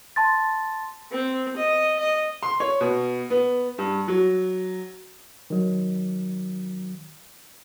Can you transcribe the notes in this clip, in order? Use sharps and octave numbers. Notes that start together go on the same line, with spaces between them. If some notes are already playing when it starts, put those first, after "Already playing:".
A5 C6 A6
C4
D#5
D#5
C6
C#5
B2
B3
G2
F#3
D#3 F#3